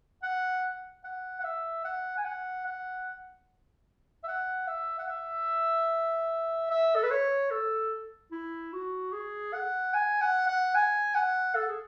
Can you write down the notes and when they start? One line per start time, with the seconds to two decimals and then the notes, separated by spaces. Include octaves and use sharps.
0.23 F#5
1.04 F#5
1.40 F#5
1.44 E5
1.85 F#5
2.18 G#5
2.25 F#5
2.66 F#5
4.24 E5
4.28 F#5
4.67 E5
4.99 F#5
5.09 E5
6.70 E5
6.96 A4
7.03 B4
7.11 C#5
7.51 A4
8.32 E4
8.73 F#4
9.12 G#4
9.54 F#5
9.94 G#5
10.21 F#5
10.48 F#5
10.75 G#5
11.15 F#5
11.55 A4
11.68 G#4